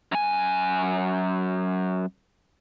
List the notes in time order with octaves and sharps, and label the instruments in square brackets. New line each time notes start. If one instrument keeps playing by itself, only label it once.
[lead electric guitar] F#2 G#5